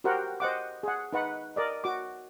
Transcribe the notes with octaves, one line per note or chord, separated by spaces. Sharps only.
F#4 G4 A#4 C5 F#5 G5
C5 D#5 F#5 D6
G#4 F#5
D#4 B4 F#5
A#4 D5 D#5
F#4 D6